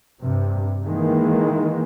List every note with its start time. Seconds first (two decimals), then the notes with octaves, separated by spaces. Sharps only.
0.22 G2 C3
0.85 D#3 E3 G#3 A#3